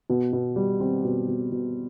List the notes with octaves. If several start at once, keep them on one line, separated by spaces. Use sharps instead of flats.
B2
B2
G3
C4
B2
B2
B2